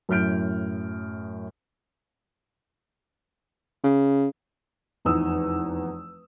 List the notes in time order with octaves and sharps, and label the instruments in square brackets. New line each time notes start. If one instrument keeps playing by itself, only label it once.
[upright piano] F#2 A2 F6 G6 D7
[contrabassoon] C#3
[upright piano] F1 E2 D#4 D#6 E6